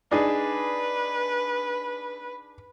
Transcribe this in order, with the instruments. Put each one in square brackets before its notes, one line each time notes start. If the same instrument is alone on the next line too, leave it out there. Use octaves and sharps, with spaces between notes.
[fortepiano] D4 D#4 G#4 [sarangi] B4